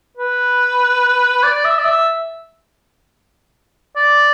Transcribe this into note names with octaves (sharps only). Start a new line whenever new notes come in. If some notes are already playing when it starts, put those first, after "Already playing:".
B4
D5
E5
D5
E5
D5